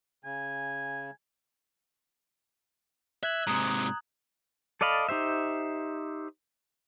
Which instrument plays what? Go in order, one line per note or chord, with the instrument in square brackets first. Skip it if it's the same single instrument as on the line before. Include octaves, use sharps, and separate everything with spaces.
[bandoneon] C#3 [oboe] G#5
[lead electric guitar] E5 [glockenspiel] F#6 G#6 F#7
[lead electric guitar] G#2 C3 [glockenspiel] A#5 D#6
[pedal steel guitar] A4 D5 D#5 F5 B5
D#4 G4 C5 E5